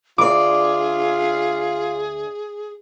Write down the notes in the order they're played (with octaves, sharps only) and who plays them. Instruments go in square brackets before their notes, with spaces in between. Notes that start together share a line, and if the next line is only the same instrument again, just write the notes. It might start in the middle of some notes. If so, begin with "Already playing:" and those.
[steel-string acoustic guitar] D2 D5 [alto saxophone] F4 [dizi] G#4 [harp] D6